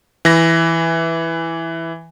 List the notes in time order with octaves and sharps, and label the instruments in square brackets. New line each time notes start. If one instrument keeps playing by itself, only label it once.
[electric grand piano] E3 A#6